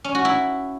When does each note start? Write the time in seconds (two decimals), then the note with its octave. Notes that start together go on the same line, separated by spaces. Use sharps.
0.04 C#4
0.15 F#4
0.25 E4